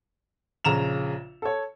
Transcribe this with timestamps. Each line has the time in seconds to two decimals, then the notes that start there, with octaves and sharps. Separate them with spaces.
0.64 A#1 C#3 A#5 E7 F7
1.42 A4 C#5